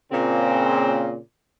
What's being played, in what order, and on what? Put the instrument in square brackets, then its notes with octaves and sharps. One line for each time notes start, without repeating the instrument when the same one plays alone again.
[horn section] A#2 C#3 C4